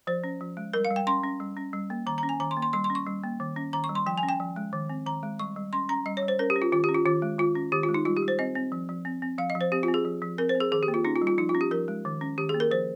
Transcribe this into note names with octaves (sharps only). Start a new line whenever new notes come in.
F3 C5
C#4
F3
G#3
G3 A#4
F5
G3
G5
C#4 C6
C#4
G3
C#4
G3
A#3
D#3 A#5
A#5
C#4
G#5
D#3 A#5
C6
A#3
C6
G3 C6
C6
C#4
C#6
G3
A#3
D#3
C#4
D#3 A#5
C#6
G3
C6
F3 G5
G#5
C#4
G5
F3
G#3
D#3
C4
D#3 A#5
G#3
G3 C#6
G3
C#4 C6
C#4 A#5
G3 D#5
C#5
G3
C5
C#4 A#4
G4
C#4
F4
D#3 F4
G4
C#4
F4
D#3 F4
G#3
D#3 F4
C#4
D#3 G4
F4
G#3
D#4
G3 F4
G4
G3
C5
C4 D#5
C4
F3
F3
C4
C4
F3 F5
D#5
F3
C5
C4 G4
F4
C4
G#4
F3
F3
C4 A#4
C5
C4
G#4
D#3 G#4
G4
A#3
F4
C#4 D#4
F4
G3
F4
F3 D#4
F4
C#4
G4
F3 A#4
G#3
D#3
C#4
D#3 G4
G#4
A#3
A#4
F3 C5